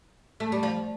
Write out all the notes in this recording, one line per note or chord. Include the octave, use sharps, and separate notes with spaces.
A3
G3
F3